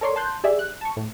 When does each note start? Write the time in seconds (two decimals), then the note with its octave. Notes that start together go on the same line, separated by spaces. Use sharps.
0.01 A4 A#4 C#5 D5 C6
0.16 A5 C6 F#6 G6
0.44 G4 G#4 D5 E5
0.59 F#6
0.81 A5 C#6
0.97 A2